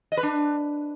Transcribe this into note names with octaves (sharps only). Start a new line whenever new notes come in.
D#5
B4
D4